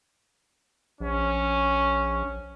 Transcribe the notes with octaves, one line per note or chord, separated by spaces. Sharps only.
A#1 C#4